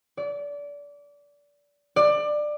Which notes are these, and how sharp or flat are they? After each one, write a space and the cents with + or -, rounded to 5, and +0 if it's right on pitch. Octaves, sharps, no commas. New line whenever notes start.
D5 -25
D5 +20